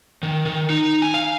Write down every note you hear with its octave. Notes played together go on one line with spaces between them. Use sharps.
D#3
D#3
D#4
G#5
F5